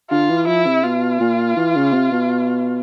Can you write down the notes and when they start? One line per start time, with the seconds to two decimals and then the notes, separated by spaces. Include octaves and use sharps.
0.10 D3 F4
0.29 E3
0.47 F3 E4
0.66 C3
0.83 B2 F4
1.20 A#2
1.56 E3
1.76 C#3
1.93 C3
2.11 B2